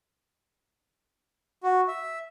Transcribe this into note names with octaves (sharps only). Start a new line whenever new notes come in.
F#4
E5